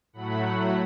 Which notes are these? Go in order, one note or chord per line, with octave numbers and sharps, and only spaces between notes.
A2 F#3 A3 F#5 B5